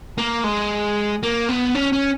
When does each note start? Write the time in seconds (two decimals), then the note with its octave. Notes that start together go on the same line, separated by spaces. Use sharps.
0.18 A#3
0.44 G#3
1.23 A#3
1.49 B3
1.75 C#4
1.93 C#4